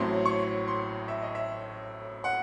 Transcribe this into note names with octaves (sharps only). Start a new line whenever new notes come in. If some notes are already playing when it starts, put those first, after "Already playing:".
Already playing: A1 A2 F#3 C4 C6
C#6
C6
E5
D#5
E5
F#5